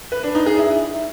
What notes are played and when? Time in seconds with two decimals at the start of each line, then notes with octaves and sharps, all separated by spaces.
0.12 B4
0.23 D4
0.35 D#4
0.46 G#4
0.58 E4